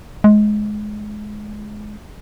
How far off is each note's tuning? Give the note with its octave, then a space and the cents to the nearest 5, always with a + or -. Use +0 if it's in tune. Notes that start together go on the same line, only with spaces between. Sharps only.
G#3 +20